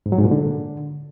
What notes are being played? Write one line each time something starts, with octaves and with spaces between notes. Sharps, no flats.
G#2
F#3
G#2
A#2
D3